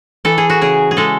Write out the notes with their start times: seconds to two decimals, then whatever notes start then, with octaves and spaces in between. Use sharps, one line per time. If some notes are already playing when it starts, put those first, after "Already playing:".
0.25 E3 A4
0.38 G#4
0.50 F#4
0.61 C#3 G#4
0.91 G#4
0.97 G#3 A4